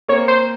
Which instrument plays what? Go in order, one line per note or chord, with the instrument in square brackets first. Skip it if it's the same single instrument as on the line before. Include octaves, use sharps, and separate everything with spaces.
[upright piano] A#3 C4 [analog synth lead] C#5
[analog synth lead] C5